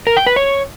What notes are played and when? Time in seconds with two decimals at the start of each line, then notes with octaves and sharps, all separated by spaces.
0.07 A#4
0.17 G5
0.26 B4
0.36 C#5